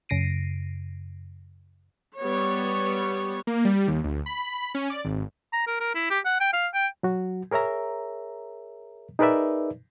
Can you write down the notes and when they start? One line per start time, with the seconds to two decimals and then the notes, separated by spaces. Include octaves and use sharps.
0.09 F#2 C#3 A#6 C7 D7 D#7
2.18 G3 B3 C#5
3.47 A#3
3.65 G3
3.88 D#2
4.04 D2
4.26 B5
4.75 C#4
4.90 D5
5.05 G#1
5.53 A#5
5.67 A#4
5.80 A#4
5.95 E4
6.10 G4
6.25 F#5
6.40 G5
6.53 F5
6.74 G5
7.03 F#3 F#4
7.51 G#4 A#4 C#5 E5 A#5
9.19 D#4 G#4 A#4 B4 D5 E5